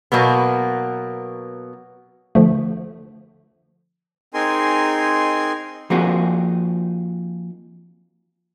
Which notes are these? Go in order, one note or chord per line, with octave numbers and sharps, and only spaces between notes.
B2 F#3 A#3 B3
D3 F3 A3
C4 D#4 G#4 A#4 G#5 C6
F3 A#3 C4 D#4 F#4 G#4